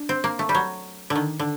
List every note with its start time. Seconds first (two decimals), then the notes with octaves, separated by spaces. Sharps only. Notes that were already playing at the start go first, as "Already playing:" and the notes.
Already playing: D4
0.09 C4
0.24 A#3
0.39 A3
0.49 G3
0.55 F#3
1.10 D3
1.15 D#3
1.39 D3